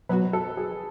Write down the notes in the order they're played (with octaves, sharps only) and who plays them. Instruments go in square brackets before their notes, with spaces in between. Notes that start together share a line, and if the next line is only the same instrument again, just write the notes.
[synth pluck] B2 F#3 B3 F#4 [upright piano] B4
[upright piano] A4
G#4